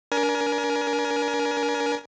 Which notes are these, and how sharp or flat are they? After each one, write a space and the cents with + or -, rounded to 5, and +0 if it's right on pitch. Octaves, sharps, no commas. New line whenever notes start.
D4 -25 A#4 +25 G#5 +25